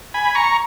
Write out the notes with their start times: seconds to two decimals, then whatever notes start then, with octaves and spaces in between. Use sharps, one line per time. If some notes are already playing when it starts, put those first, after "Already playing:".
0.14 G#5 B5
0.35 A#5 C#6